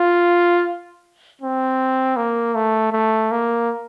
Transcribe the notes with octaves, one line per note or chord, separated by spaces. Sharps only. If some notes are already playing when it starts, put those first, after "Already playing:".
Already playing: F4
C4
A#3
A3
A3
A#3